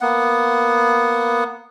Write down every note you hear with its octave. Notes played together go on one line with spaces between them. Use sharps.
A#3 B3 F#5